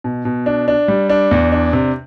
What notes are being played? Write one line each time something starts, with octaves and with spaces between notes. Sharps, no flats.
B2
B2
D4
D4
G3
D4
E2
D4
C3